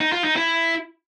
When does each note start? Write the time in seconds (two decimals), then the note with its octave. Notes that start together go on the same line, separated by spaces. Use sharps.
0.01 D#4
0.12 F4
0.24 D#4
0.36 E4